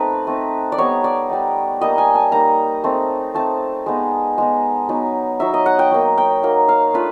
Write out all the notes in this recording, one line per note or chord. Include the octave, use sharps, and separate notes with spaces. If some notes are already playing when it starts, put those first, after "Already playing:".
Already playing: A3 C4 D#4 B4
A3 C4 D#4
D5
G3 B3 D#4 C#5
D5
G3 B3 D#4
G3 A#3 D#4 D#5
G#5
A5
G3 A#3 D#4 A#5
A3 C4 D#4
A3 C4 D#4 A5
G#3 B3 D#4
G#3 B3 D#4
F#3 B3 D#4
F#3 B3 D#4 E5
D#5
F#5
G5
F#3 A#3 D#4
G5
F#3 A#3 D#4
F5
A3 D4 F4 B4